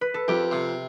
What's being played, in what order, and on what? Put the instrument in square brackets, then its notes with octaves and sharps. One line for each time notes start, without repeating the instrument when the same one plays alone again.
[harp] B4
A4
[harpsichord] F2 [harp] G4
[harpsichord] C3